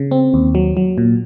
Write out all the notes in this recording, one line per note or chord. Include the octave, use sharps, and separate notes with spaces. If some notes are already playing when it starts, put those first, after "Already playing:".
Already playing: C#3
C4
D#2
F#3
F#3
A#2